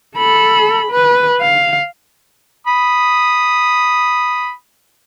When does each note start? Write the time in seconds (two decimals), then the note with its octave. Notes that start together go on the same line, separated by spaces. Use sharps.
0.17 A4 B5
0.91 B4
1.41 F5
2.67 B5 D#6